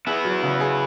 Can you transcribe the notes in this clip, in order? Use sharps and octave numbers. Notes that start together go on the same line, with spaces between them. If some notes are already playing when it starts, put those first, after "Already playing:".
B3 E4 G#4
F#3
C#3
G#4